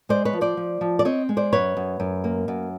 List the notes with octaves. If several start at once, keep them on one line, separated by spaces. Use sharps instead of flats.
G#3 C5 D5
B4 C#5
F3
C5 D5
F3
F3
D5
C4 C#5 D#5
G#3
C5 D5
F#2 B4 C#5
F#2
F#2
A#3
F#2